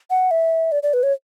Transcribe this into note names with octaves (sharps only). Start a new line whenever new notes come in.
F#5
E5
D5
D5
B4
C#5